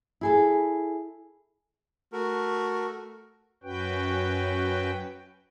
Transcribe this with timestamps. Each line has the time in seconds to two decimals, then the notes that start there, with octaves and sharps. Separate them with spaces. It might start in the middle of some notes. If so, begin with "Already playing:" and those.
0.21 E4 G#4 A4
2.13 A3 F#4 A#4
3.63 F#2 C#4 F#4 B4 G5